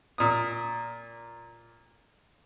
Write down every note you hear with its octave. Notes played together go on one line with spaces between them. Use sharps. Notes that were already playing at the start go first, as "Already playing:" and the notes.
A#2 D#6